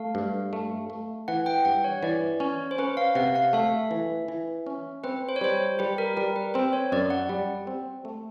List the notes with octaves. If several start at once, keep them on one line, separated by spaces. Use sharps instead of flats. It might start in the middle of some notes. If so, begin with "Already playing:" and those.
Already playing: A3 F5
G2
A3
A3
E3 F#5
G5
G2 F#5
C#5
E3 D5
C#4 C#5
C5
C#4 B4
F5
C3 F#5
F5
A3 E5
E3
E3
C#4
C4 B4
C5
C#5
G3 C5
G3 B4
A#4
G3 A#4
B4
C4 C5
C#5
F#2 D5
F#5
G3
C4
A3